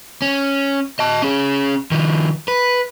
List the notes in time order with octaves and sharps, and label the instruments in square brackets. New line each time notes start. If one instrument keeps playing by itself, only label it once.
[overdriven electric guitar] C#4
D#5 A5
C#4 G#4
D#3 F3
B4